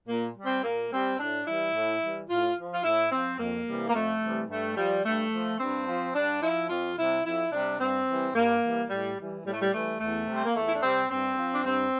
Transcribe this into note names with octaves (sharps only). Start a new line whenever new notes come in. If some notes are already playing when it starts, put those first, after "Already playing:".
A#2 A#3
G3
C4
A#2 A#3
G3 C4
A2 D4
E3 G3 E4
A2
E3 G3
A2 F4
F3
F4
A2 E4
F3 C4
F2 A#3
C3 E3 G3
A#3
F2 A3
C3 E3 G3
G2 A3
F3 G3
G2 A3
F3
G2 C4
F3
G2 D4
F3 E4
F2 F4
C3 G3 E4
F2 E4
C3 G3 D4
G2 C4
E3 G3
G2 A#3
E3 G3
A2 G3
E3 G3
A2 G3
A3
G3
E3 G3 A3
E2 A3
C3 G3
C4
A#3
E2 A3
E4
D4
C3 G3 C4
G2 C4
F3
D4
G2 C4